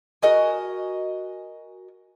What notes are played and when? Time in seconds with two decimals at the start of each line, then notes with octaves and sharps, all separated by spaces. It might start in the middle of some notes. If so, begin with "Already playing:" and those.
0.22 F#4 A#4 D#5 G#5